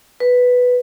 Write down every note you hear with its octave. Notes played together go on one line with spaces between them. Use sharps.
B4